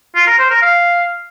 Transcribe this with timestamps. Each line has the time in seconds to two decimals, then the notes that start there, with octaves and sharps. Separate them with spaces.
0.15 F4
0.27 A#4
0.39 C5
0.50 A#4
0.62 F5